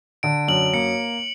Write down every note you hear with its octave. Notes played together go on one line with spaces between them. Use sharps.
D3 D7
F#2 F#7
A#3 C#7